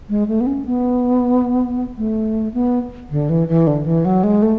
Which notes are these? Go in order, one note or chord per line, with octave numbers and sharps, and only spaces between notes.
G#3
A3
B3
C#4
B3
A3
B3
D3
E3
E3
D3
E3
F#3
G#3
A3